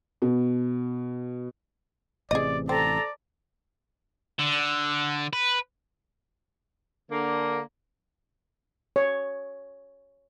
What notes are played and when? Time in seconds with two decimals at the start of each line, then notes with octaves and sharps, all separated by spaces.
0.22 B2
2.31 A1 C3 E3 G#4 D5 D#5
2.69 C4 A4 D5 A#5
4.39 D3
5.33 B4
7.11 D3 A#3
8.96 C#5